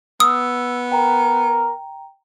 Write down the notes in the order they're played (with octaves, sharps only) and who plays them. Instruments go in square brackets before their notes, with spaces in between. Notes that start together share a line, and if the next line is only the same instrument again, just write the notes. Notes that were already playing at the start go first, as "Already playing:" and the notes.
[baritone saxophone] B3 [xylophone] D#6 [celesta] E6
[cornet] A#4 [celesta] G5 A#5